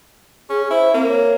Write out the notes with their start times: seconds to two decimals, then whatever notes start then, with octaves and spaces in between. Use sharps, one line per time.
0.50 C#4 G#4
0.71 E4 C5
0.94 A#3 C4
1.08 C#5